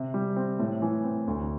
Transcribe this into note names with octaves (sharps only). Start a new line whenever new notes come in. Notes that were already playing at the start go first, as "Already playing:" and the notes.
Already playing: C3
G3
C4
A2
E3
C4
D2